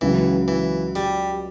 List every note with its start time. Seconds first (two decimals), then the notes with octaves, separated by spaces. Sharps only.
0.01 C#2 C#3 E3 F#3
0.48 E3
0.95 G3